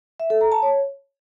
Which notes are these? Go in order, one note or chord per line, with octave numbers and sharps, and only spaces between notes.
E5
A4
A#5
A5
C#5